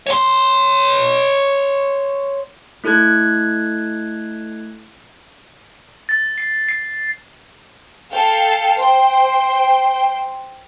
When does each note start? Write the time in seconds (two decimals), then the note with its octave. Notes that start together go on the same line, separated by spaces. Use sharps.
0.07 C#5 C6
2.84 A3 E4 A4 F#6 G#6
6.09 A6
6.38 C7
6.69 C7
8.12 A4 F5 G5 A5
8.77 C5 G5